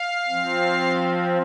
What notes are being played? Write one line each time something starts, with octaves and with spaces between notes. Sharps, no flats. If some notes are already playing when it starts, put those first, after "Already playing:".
Already playing: F5
F3 C4